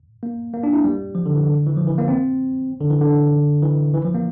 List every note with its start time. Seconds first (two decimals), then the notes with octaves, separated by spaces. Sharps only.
0.23 A#3
0.54 A#3
0.63 D4
0.73 E4
0.84 G3
1.15 F3
1.26 D3
1.36 E3
1.46 D3
1.67 E3
1.77 F3
1.87 E3
1.98 A#3
2.08 C4
2.80 D3
2.90 E3
3.01 D3
3.63 E3
3.94 E3
4.05 F3
4.15 A#3